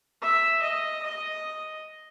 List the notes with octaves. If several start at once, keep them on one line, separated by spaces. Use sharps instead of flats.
E5
D#5
D#5